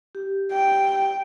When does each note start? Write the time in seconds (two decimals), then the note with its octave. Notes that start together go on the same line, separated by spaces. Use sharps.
0.15 G4
0.51 G5